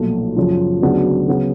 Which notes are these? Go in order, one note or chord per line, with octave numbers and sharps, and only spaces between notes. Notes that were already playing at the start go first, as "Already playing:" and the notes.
Already playing: B1 A#2 F3 A3
F#2 C#3 F3
D2 C#3 F#3 B3 D4
C#3 F#3 B3